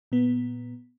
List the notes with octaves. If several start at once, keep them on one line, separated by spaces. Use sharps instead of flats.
A#2 B3